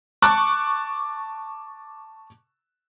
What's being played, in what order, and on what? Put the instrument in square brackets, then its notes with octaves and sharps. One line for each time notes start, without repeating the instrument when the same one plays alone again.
[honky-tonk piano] A5 C#6 D6 F#6